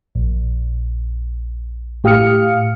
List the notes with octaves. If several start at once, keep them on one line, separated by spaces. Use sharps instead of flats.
A#1
A2 G4 F5 D#6 F6 C#7